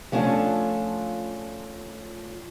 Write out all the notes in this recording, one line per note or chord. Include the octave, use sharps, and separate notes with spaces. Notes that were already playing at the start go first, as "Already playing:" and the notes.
F3 A3 B3 C#4 D4 F4